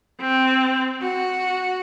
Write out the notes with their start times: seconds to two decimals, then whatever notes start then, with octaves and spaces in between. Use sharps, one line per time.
0.21 C4
1.02 F#4